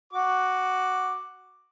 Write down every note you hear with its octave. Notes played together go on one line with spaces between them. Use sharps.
F#4 D6